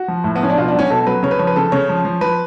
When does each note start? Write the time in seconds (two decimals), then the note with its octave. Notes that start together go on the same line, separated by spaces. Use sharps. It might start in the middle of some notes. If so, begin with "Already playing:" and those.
Already playing: F#4
0.08 F3
0.24 A2
0.35 B3
0.41 F3 C#4
0.50 D4
0.58 B2 F4
0.68 D4
0.74 F#3 C#4
0.90 B2 A4
1.07 F#3 B4
1.23 C#3 C#5
1.31 B4
1.39 F3 C#5
1.47 B4
1.56 C#3 A4
1.72 C#3 C#5
1.89 F3
2.05 F3
2.21 F3 B4